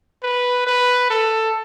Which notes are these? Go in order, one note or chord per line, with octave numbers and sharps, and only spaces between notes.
B4
B4
A4